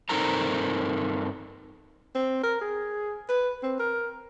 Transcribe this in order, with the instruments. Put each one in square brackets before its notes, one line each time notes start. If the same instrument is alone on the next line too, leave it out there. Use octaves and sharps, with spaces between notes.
[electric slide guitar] G2 C4 D#4 A4 A#4 A#5
[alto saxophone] C4
A#4
G#4
B4
C4
A#4